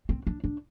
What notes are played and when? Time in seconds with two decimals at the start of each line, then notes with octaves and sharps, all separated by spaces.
0.09 C4
0.27 D4
0.44 D4